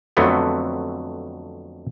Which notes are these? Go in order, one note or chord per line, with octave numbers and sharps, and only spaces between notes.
F2 D3 F#3 A3 B3 C4